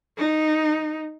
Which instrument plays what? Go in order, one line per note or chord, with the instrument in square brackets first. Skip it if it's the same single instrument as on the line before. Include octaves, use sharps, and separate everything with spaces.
[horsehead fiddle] D#4